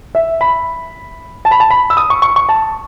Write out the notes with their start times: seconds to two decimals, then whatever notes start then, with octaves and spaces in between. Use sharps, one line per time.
0.15 E5
0.41 B5
1.45 A5
1.51 B5
1.60 A5
1.70 B5
1.90 E6
1.97 D#6
2.10 C#6
2.22 C#6
2.36 C#6
2.49 A5